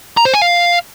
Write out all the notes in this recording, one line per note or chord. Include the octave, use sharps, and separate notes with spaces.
A#5
C5
G#5
F5